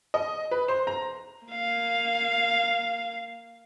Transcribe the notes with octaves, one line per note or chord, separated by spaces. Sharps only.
D#5
B4
C5
A#5
A#3 F5